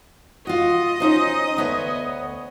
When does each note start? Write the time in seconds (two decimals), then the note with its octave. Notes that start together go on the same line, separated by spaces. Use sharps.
0.47 F4 F#4 D#5
1.00 C#4 D#4 C5
1.57 D2 B3 C#5